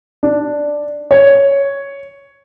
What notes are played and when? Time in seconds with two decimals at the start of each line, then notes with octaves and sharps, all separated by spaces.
0.23 D4
1.11 C#5